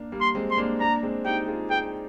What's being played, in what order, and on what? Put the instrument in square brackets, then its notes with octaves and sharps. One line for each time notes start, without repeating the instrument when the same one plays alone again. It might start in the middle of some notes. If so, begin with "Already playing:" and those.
Already playing: [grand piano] A#3 D4
G3 A#3
[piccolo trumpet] C6
[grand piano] G#3 C4
[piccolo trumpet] C6
[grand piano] A#3 D4
[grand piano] A#3 D4 [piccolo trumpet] A#5
[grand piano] G#3 C4
[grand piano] D#4 G4 [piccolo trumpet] G5
[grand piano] F4 G#4
[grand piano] G#4 C5 [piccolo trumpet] G5